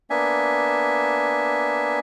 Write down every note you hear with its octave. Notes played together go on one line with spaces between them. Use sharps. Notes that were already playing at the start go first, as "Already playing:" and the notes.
A#3 B3 D4 E5 G#5